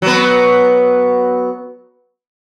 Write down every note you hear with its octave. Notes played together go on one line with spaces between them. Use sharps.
F#3 B3